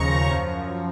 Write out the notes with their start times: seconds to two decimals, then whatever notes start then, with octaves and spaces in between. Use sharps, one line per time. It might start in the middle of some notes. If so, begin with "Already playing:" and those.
Already playing: D#2 C#3 F3 A#5 C#6
0.29 F#2 F3